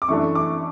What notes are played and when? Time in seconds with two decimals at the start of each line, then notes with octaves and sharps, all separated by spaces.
0.02 D6
0.08 F#2 E3 A3 D4 C#6
0.35 D6